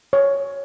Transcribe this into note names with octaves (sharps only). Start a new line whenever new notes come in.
C#5